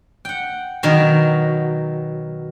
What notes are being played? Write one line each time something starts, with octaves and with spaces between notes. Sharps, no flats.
F#5 G5
B2 D#3 F#3